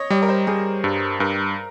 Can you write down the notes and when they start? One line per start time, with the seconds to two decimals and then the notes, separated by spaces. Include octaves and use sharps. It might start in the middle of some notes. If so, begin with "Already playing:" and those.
Already playing: C#5 D#5
0.10 G3 C#5
0.22 A#4
0.29 C5
0.47 G3 G#4
0.84 G2
1.20 G2 A#4